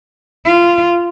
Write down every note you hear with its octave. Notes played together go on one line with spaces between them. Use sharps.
F4